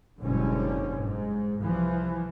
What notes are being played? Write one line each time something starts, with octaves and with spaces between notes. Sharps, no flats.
F#1 G#2 B2 D3 G3 C#4
G#2
C2 E3 F3